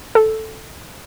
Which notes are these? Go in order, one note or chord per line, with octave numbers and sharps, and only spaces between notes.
A4